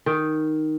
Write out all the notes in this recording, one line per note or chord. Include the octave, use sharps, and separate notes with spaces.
D#3